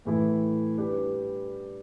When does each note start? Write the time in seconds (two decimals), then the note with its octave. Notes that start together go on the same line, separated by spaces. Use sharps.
0.05 A2 E3 A3 E4
0.77 G3 D4 G4 B4